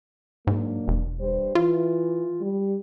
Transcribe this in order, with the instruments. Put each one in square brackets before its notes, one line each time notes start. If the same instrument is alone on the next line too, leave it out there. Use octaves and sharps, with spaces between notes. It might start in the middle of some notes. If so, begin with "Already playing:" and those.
[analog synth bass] G#2 [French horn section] F#3 A#3 D4
[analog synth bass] E1
[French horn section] G2 G3 C5
[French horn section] E3 [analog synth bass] F4
[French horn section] G3